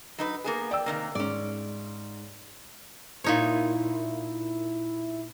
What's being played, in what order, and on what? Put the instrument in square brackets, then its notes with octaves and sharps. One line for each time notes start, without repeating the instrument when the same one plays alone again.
[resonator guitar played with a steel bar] F#3 D#4 B4
A#3 B3 G#4
[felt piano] D5 G5 E6
[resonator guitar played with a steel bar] C3 D#3 A#3
[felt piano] G#2 [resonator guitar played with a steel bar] C#4 D5
[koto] A#2 D#4 C#5 [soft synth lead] E4